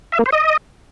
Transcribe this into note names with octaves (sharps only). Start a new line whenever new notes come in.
E5
A#3
C5
D#5